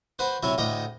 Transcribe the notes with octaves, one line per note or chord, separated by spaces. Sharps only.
F#4 B4 C5
C3 F#3 E4 C#5
D2 A2 G4 D#5 A#5